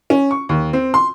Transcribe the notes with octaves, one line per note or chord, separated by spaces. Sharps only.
C#4
C#6
D#2
C4
C6